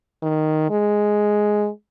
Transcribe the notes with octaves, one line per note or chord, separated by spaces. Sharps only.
D#3
G#3